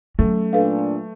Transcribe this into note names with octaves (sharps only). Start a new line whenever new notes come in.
F#3 A3 C#4
A#2 D4 A4 B4 F5